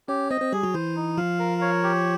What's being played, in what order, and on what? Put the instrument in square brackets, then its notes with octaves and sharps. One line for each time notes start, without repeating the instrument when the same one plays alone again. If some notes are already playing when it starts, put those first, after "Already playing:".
[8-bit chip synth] C#4 C#5 [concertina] G4
[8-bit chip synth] C4 C5 [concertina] D#5
[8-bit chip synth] C4 C5
[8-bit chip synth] G3 G4 [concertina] G#4
[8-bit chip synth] F#3 F#4
[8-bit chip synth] E3 E4 [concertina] C5
[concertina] D#4
[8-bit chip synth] F3 F4 [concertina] F5
[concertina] A#4
C#5
G4